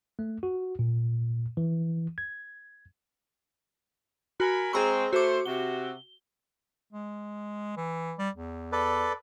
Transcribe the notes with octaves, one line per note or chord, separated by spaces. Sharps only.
A3
F#4
A#2
E3
G#6
F#4 A#4 G#5 B5
G#3 C4 G#4 A#5 C#6
A3 F#4 C5 D6
C3 F#4 G7
G#3
E3
G3
E2
A4 B4 D5